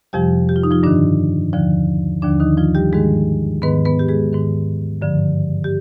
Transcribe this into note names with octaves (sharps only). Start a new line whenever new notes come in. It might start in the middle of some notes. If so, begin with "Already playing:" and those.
F2 C3 F3 G3 G4
G4
F4
D#4
F3 F4
G2 D3 D#3 D4
D#2 D3 F3
D#2 D3 F3 D4
D#3 D#4
F3 F4
G3 G4
G#2 D#3 G#3 G#4
G#2 D#3 B3 B4
B3 B4
G4
G#3 G#4
G#2 D#3
G2 D3 F3
G4